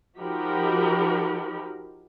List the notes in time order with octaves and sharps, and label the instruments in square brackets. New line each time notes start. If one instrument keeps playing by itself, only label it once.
[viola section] F3 D#4 F#4 G4 A#4 B5